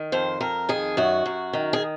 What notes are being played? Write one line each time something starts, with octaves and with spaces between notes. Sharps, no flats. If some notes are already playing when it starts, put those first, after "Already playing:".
Already playing: D#3
F2 C5
F2 A#4
D#3 G#4
F#2 F#4
F#2
D#3
G#4